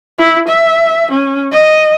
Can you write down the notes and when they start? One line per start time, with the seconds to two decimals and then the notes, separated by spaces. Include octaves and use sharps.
0.18 E4
0.48 E5
1.11 C#4
1.52 D#5